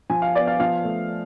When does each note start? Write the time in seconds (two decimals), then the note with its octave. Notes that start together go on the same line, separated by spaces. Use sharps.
0.10 F3 G#5
0.22 F5
0.35 B3 D5
0.47 F5
0.60 F3 F5
0.85 A3